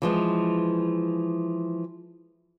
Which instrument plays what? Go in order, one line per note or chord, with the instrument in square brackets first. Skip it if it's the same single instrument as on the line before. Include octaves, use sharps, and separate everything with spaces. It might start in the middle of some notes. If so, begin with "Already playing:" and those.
[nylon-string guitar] E3 F3 G#3